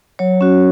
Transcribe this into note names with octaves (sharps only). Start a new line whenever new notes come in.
F#3 C#5
C#4 F#4